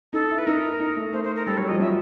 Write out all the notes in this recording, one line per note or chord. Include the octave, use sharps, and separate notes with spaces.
D#4 A4
E4
B4
D#4 A#4
D#4
A3
A3 C5
C5
A#4
G3 A4
F#3 C#5
F3 D#5
F#3 E5